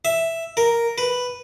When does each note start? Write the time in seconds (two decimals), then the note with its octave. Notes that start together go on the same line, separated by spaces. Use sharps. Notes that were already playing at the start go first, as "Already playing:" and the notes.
0.05 E5
0.57 A#4
0.98 B4